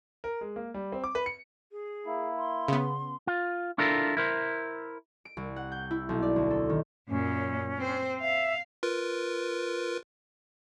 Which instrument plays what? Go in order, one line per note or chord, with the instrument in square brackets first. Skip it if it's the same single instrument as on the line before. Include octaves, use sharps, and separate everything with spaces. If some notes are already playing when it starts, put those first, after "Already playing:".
[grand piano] A#4
G#3
A#3
G3
C4
D6
B4
C#7
[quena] G#4
[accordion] A#3 E4
[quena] C6
[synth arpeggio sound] C#3 B3
[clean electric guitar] F4
D4 E4 F4 A4 A#4
E4 A#4 C5
[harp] D7
C2
F#5
G6
E4
B1
D5
D2
A4
D#3
[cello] F#2 A#2 [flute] C#4
[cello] C4 C5
[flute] E5 [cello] F5
[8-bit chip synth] F4 A#4 B4